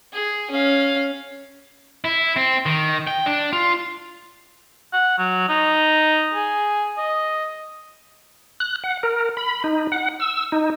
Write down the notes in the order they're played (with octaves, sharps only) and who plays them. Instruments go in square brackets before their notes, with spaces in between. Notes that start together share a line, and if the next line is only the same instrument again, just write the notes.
[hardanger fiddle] G#4
C#4 F5
[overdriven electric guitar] E4
C4
D#3
G5
D4
F4
[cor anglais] F#5
F#3
D#4
G#4
D#5
[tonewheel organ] F#6
F#5
A#4
B5
D#4
F#5
E6
D#4